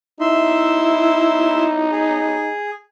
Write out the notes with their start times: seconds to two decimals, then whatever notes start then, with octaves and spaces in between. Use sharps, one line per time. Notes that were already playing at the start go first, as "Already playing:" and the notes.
0.20 D#4 E4 E5 C6
1.92 G#4